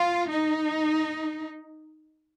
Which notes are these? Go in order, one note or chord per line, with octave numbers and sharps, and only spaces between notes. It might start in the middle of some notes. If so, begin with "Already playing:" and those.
Already playing: F4
D#4